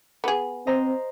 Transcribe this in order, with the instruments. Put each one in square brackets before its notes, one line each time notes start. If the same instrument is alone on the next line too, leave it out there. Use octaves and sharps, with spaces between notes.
[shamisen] B3 G#4
[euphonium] C4 [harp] C5 D#5 A#5